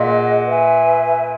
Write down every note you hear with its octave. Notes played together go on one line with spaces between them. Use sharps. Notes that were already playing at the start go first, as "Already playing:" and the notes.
Already playing: A#2 G#4 D#5 F#5
B4 E5 G#5